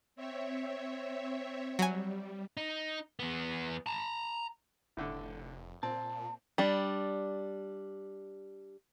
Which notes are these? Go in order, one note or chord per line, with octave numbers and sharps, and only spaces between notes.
C4 C#5 E5
F#3 G3 G#5
D#4
E2 B3
A5 A#5
F1 A2 D3
A#2 C4 A5
G3 D4